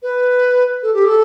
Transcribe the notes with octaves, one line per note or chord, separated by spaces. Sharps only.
B4
A4
G4
A4